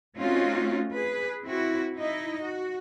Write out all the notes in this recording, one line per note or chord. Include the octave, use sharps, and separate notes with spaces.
A3 C4 C#4 D#4 F4 F#4
G#4 B4
C4 E4 F#4
D#4 E4 D#5
F#4